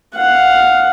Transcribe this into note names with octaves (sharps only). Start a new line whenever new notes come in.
F5 F#5